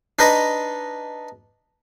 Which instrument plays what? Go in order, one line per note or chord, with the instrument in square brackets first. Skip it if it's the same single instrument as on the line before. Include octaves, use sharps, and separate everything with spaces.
[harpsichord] D4 D#4 B4 D#5